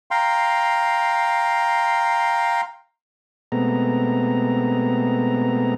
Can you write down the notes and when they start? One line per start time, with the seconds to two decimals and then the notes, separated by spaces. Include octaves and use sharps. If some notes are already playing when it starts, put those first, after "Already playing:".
0.11 F5 G5 A#5 C6
3.52 B2 G#3 A3 B3 C4 A#5